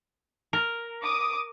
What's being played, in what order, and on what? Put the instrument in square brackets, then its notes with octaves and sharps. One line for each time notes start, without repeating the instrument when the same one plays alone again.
[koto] A#4
[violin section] D6 D#6